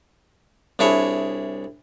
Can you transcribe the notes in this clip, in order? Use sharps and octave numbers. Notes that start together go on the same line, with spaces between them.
C2 D4 E4 G#4 C#5